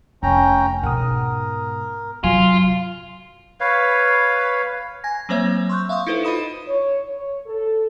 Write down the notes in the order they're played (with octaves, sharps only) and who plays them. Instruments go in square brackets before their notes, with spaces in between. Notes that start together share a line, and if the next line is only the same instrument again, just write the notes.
[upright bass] F1 [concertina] C#4 G5 A#5
[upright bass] G#2 B2 [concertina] A#4 [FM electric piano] F#5 D#6
[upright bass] G2 C3 [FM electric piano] F#3 G#5 [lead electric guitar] F4
[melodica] B4 C#5 F5
[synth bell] G#5 G#6 A#6
F#3 A#3 C4 C5 C#5 E5
C6 C#6 E6 F#6 G6
E5 F5 C6 C#6 D#6
D#4 E4 A4 B4 C5
F4 D#5 B5 D#6 E7
[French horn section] C#5
C#5
A4